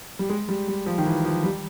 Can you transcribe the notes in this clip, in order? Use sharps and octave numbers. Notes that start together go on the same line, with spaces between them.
G3
G#3
G3
G3
F3
D#3
E3
F3
G3